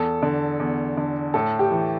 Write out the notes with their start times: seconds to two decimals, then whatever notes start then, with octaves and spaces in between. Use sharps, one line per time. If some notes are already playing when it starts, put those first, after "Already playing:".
Already playing: E2 A4
0.23 D3
0.60 E2
0.97 D3
1.34 A2 A4
1.59 G4
1.71 E3